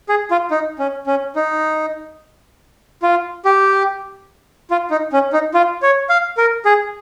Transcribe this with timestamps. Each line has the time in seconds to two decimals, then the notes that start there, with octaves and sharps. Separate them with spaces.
0.09 G#4
0.31 F4
0.51 D#4
0.79 C#4
1.07 C#4
1.36 D#4
3.03 F4
3.45 G4
4.71 F4
4.91 D#4
5.13 C#4
5.33 D#4
5.54 F4
5.82 C#5
6.09 F5
6.37 A#4
6.65 G#4